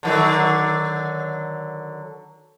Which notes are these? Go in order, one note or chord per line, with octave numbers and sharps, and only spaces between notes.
D3 D#3 F#3